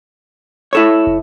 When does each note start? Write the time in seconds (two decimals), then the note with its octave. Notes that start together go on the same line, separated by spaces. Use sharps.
0.73 E4 A4 C#5
1.07 F#1